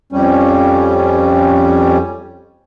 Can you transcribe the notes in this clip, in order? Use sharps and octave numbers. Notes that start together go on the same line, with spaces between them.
F2 G3 C#4